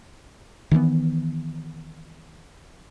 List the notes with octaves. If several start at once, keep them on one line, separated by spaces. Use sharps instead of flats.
D#3 E3 G3 B3